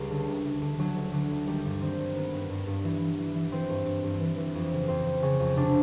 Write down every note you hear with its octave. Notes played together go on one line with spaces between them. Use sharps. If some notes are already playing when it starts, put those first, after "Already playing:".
Already playing: C#2 G3
D3
D2
D2
D3
D3 F#3
D2
D3 F#3
D2
D#3 G3
G2
D#3 C4
G2
D#3 B3
G2
G2
G2
E3
E3
E3
E3
E3 C4
G2
G2
G2
E3
E3
F2
C#3
F2 C4
F2
C#3 C#4
F2
C3 D4